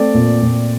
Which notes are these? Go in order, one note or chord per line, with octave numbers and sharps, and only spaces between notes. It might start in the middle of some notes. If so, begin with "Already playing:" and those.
Already playing: A3 C4 D5
A#2
A#2